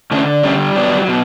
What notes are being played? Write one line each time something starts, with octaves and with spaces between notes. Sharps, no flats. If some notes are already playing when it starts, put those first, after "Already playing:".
D3 A3 C#4
G3 A3 C#4
F#3 B3 D4
B2